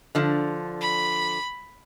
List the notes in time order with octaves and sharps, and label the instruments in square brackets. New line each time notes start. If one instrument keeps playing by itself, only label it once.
[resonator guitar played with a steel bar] D3 F3
[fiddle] B5